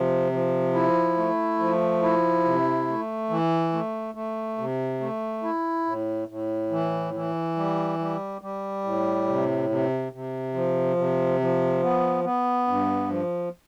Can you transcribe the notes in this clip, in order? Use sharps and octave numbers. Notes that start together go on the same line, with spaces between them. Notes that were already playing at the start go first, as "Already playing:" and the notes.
Already playing: C3 F3
F3
E4
A3
F3
E4
C3
A3
E3
A3
A3
C3
A3
E4
A2
A2
E3
E3
G3
G3
G3
A2
C3
C3
C3
F3
C3
F3
B3
B3
G2
F3